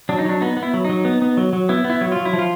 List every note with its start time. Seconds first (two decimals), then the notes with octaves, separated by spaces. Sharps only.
0.09 F#3 D4
0.18 D#4
0.25 F#3 D4
0.41 B3 D#4
0.57 B3
0.63 E4
0.74 F#3
0.85 F#3 D#4
1.05 B3
1.22 B3
1.37 F#3
1.53 F#3
1.69 B3 E4
1.85 B3
1.90 E4
2.01 F#3
2.12 F#3 F4
2.25 E4
2.33 F3
2.39 F4